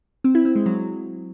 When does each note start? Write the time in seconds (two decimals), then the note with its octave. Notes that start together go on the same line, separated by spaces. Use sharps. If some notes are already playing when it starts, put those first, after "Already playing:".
0.24 C4
0.35 E4
0.45 C4
0.56 G#3
0.66 F#3